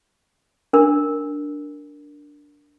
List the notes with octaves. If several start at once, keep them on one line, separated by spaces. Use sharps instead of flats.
D4 A#4